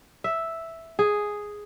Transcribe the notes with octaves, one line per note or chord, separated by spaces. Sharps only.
E5
G#4